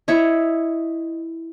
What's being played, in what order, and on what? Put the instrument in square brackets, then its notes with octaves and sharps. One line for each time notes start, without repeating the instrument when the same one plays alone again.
[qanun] E4 C#5 D#5